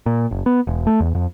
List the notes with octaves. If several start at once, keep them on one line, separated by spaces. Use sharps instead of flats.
A#2
F#1
B3
E1
A3
E2
F2